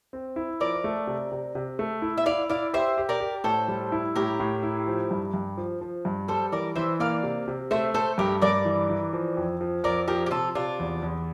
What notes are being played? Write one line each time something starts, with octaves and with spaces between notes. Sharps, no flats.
C4
E4
F3 A#4 D5
A3
C3
C3
C3
A3
E4
E5
E4 D5 F5
E4 D5 F5
G4 C5 E5
G4
A#4 D5
G4
A2 A4 C5
G3
E4
A2 G4 A#4
A2
E4
F3
G2
G2
F3
F3
G2
G3 A4 C5
E3 A#4 D5
E3 C5 E5
A#3 D5 F5
C3
C3
A3 C5 E5
A3 A4 C5
G2 G4 A#4
G2 A#4 D5
E3
E3
F3
F2
F3
F2 A#4 D5
F3 G4 A#4
G4
C3 F4 A4
C3 D4 F4
E2
E2